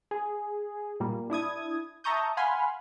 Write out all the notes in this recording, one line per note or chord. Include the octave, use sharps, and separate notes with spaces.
G#4
A#2 G3 A#3
D4 E4 D#6 G#6
E5 A5 A#5 C#6 D#6 G6
F5 F#5 G#5 B5 C6 F6